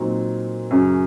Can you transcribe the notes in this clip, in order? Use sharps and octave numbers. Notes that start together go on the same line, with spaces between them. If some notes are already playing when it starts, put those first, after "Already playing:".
Already playing: A#2 F#3 C4 D#4
F#2 C#3 F#3 C#4